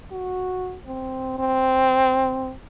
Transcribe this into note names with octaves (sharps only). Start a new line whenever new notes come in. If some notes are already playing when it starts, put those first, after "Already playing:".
F#4
C4
C4